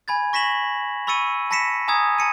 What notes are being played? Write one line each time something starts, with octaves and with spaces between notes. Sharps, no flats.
G#5 B5 G#6 A6
C#6 A#6 B6 E7 F#7
B5 C#6 E6 A6 C#7 D#7
A5 B5 A#6 B6 C#7 E7
G#5 A#5 D#6 E6 G#6
A5 C#7 D#7